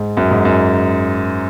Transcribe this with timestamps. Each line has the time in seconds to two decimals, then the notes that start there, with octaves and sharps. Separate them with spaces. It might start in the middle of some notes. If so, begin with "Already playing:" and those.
Already playing: G#2
0.17 F#2
0.31 G#2
0.45 F#2